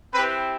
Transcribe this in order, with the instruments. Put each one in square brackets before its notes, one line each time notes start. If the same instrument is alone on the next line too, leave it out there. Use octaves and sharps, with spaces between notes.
[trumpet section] C4 E4 G4 B4